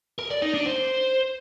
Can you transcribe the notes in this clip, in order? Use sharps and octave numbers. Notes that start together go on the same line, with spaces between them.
A#4
D5
D#4
D4
C5